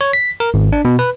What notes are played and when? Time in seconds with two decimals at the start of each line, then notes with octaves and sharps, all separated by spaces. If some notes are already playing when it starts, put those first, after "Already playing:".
0.01 C#5
0.13 B6
0.40 A#4
0.54 G#1
0.72 D4
0.85 B2
0.99 B4